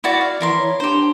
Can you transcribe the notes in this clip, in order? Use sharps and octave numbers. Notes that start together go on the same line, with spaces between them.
E4 F#4 D5
F5
E3 E4 A#4 C6
C#5
D4 G4 C5